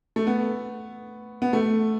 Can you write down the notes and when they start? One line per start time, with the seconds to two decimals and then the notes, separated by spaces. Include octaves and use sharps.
0.16 A3
0.27 B3
1.42 B3
1.53 A3